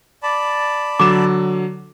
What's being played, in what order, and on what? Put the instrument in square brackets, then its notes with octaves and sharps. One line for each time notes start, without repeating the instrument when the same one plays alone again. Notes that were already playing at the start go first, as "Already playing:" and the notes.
[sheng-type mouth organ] D5 A5 B5
[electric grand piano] D3 F#3 E7 [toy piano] D6